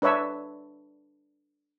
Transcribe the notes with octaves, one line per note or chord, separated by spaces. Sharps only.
D4 B4 C#5 E5